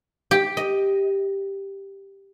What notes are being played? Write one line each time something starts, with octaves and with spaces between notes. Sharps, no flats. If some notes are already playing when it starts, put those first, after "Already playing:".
G4
D#5